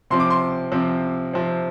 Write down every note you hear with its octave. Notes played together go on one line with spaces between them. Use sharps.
C3 F3 C4 C6
D6
C6
C3 F3 C4
C3 F3 C4